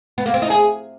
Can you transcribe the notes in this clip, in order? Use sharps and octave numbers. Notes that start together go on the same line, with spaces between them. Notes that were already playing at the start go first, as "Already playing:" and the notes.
B3
A#3
C4
D#4
G#4